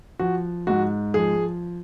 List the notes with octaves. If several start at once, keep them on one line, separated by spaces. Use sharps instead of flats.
F3 F#4
G#2 F#4
F3 G#4